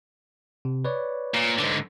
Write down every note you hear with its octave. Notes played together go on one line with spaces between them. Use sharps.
C3
B4 C#5 D5
A#2
G#2 D3